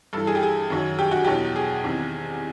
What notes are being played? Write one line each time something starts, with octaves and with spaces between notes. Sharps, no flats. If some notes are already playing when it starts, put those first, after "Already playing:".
G2 E3 A4
G#4
G4
G#4
F#2 D#3 F#3
G4
F#4
E2 B2 F#3 G4
G#4
E2 C3 D#3